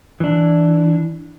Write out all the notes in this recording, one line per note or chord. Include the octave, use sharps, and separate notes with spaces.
E3 D4